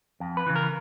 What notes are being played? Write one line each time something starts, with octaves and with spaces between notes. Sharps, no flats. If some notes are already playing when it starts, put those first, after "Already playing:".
F2
B4
C#3 E3
A#4